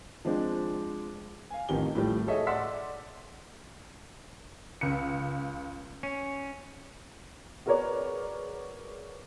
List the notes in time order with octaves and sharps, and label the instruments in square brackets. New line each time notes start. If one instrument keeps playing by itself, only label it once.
[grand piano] F3 G#3 C4 D4
F5 G#5
A1 F2 D#3 G4 G7
A2 F3 G3
G#4 A4 C#5 D#5 E5
D5 F#5 C6 E6 B6
[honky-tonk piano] C#2 C#7
[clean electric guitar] C#4
[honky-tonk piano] F#4 G#4 A#4 B4 C#5 D5